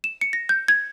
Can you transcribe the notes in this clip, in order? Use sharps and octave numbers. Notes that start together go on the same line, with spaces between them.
E7
C#7
A#6
G6
G#6